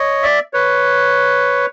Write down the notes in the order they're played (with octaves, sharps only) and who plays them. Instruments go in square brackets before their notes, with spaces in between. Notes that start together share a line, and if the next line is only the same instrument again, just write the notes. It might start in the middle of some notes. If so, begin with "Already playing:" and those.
Already playing: [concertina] C#5 D#5
D5 E5
B4 C#5